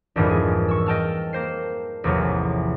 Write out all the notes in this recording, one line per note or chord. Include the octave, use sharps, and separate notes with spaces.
A#1 F2 G#2 E3 F3 G3
G#4
C#6 E6
D#5 G5 A5 F6
A#3 C5 C7
A1 E2 C3 F3 F#3